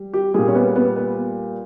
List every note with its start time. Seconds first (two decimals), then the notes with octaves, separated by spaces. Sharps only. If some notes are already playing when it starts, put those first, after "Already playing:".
Already playing: G3
0.14 G4
0.34 A#2 G3 G#4
0.48 C#4
0.55 B3
0.76 B3
0.96 B3